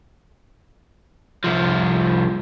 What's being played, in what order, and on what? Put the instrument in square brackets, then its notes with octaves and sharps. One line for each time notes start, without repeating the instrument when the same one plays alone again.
[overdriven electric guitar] C2 F3